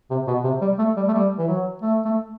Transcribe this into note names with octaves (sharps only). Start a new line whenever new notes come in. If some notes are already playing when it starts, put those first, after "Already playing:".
C3
B2
C3
G3
A3
G3
A3
G3
E3
F#3
A3
A3